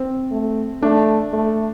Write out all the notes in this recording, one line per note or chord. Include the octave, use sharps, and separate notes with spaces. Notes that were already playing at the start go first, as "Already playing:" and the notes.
Already playing: C4
A3
A3 D4
A3